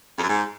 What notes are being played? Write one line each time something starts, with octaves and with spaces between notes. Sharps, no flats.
F2
F#2
G#2